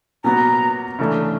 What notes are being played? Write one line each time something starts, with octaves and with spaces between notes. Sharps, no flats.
A#2 F#3 B3 A#5
C#3 E3 A3 D4